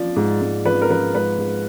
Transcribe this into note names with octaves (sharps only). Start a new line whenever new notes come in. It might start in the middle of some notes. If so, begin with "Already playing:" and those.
Already playing: F3 D5
G#2
G#2
F3 B4
A#4
F3 B4
G#2 B4
G#2